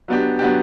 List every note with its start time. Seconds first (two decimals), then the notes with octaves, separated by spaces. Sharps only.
0.08 F#3 B3 D4 G4
0.39 F#3 B3 D4 G4